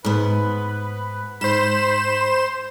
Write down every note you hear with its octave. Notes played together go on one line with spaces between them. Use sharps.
G#2 B3 B4
G#2 C5 B5 E7